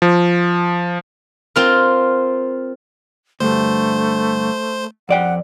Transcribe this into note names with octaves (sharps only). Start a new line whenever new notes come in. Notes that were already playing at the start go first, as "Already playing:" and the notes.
F3
C4 F4 A#4
D2 G2 A3 C5
F2 D5 F#5 G5